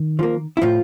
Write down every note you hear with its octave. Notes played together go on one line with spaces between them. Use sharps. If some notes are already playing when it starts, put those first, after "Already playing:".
Already playing: D#3
F3 A#3
E4
A2 F3 F4